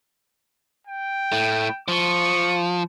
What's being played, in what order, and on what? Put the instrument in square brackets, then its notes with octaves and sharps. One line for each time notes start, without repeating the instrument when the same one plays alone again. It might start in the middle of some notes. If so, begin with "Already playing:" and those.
[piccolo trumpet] G5
[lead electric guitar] A2 A3
[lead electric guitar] F3 [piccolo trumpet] C#6